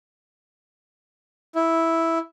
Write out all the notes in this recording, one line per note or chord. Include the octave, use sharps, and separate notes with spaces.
E4